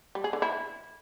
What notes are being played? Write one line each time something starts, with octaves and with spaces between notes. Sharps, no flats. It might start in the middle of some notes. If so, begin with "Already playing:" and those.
G3
G#4
D3
E4